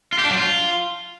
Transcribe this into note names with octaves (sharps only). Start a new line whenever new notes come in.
F4
G4
D4
F#3
F4